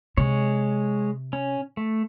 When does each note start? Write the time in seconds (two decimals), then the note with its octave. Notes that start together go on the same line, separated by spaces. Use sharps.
0.17 C3 G#3 C#5
1.33 C#4
1.77 A3